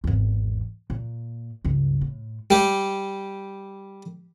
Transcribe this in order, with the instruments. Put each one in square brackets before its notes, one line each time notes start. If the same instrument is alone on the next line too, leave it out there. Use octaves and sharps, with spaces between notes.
[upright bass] G#1 E2
A#2
C#2 G2
A2
[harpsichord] G3 G4